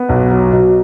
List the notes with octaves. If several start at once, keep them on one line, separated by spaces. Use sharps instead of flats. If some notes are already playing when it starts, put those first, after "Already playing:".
Already playing: B3
B1
F#3
B2